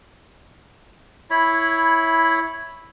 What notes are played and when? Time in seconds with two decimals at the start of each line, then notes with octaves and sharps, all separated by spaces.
1.30 E4 C#5 B5